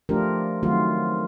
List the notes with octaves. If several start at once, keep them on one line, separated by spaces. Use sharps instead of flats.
F3 A3 D4 F4 G4 A#4
D#3 F#3 A3 C4 F4 F#4